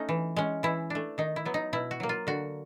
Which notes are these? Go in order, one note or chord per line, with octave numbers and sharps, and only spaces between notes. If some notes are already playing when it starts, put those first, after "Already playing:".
Already playing: A3 C#4 D#4
E3
G#3 C#4
E3 E4
A3 D4
D#3 D#4
E4
F#3 B3
D#4
B2 E4
F#4
F#3 A#3
F4
D3 F#4